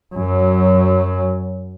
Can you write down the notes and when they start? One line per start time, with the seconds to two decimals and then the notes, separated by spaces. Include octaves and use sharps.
0.15 F#2 F#3